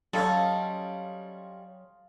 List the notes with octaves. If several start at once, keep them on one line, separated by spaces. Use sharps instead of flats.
F#3 G3 C#4 F4 A4 C#5 D#5